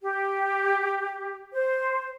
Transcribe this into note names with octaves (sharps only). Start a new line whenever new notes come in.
G4
C5